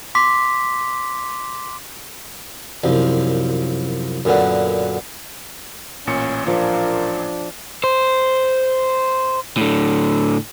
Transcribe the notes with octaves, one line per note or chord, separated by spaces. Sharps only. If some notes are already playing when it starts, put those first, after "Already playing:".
C6 D6 B6
C2 F#2 F3
F#2 A#2 D3 B3 F#5
A1 A#2 C#4 C#7
F3 D4 A#4
C5
A2 D3